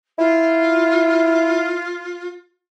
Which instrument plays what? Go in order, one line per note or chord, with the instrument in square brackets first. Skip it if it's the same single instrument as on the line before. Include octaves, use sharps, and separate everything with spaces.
[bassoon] E4 [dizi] F4